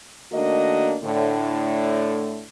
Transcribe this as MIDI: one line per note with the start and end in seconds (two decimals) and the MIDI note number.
0.33 0.96 51
0.33 0.96 57
0.33 0.96 58
0.33 0.96 62
0.33 0.96 66
0.33 0.96 75
1.03 2.45 45
1.03 2.45 50